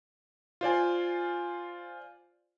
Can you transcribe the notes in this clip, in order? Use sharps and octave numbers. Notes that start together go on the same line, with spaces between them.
F4 C5 D5 G#5